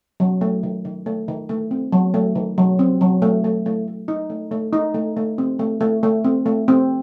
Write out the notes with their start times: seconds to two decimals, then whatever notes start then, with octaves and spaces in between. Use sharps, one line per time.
0.20 F#3
0.41 A3
0.63 D#3
0.85 D#3
1.06 A3
1.28 D#3
1.49 A3
1.71 C4
1.92 F#3
2.14 A3
2.35 D#3
2.58 F#3
2.79 C4
3.01 F#3
3.22 A3
3.44 A3
3.66 A3
3.87 A3
4.08 D#4
4.30 A3
4.51 A3
4.73 D#4
4.94 A3
5.17 A3
5.38 C4
5.59 A3
5.81 A3
6.03 A3
6.25 C4
6.46 A3
6.68 C4